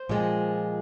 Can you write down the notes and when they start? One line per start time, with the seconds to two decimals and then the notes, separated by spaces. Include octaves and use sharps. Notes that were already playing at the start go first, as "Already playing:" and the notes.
Already playing: C5
0.09 A#2 F3 G#3 C4